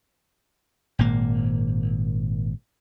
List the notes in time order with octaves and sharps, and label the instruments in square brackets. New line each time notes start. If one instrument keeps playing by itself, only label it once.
[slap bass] G#1 A#2 A#3